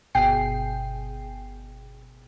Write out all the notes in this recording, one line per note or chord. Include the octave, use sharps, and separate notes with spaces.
G1 B2 G#4 G5 C7